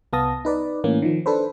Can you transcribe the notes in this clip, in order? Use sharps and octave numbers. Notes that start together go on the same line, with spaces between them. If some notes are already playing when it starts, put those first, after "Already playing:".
C2 B3 F5 A5 D#6 A#6
D#4 B4 D5
A2 E3 A#3 C#4
D#3 F3
D4 A4 B4 C5